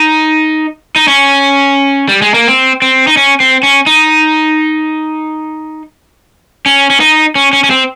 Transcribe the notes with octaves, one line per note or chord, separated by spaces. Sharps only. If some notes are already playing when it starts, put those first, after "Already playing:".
Already playing: D#4
D#4
C#4
G3
G#3
A#3
C4
C4
D#4
C#4
C4
C#4
D#4
C#4
C#4
D#4
C#4
C#4
C#4
C4